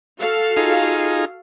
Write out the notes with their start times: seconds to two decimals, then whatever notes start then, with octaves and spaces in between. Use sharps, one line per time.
0.18 F#4 A4 F5
0.57 D#4 F4 G#4